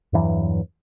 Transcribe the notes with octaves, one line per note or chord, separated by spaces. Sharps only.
E2 G2 E3 F#3